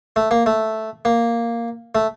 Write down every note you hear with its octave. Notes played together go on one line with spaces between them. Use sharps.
A3
A#3
A3
A#3
A3